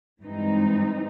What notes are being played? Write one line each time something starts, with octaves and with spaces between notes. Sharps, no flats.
G2 E3 G#3 C4 D#4